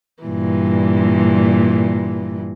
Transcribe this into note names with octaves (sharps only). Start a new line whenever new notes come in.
G2 A#2 E3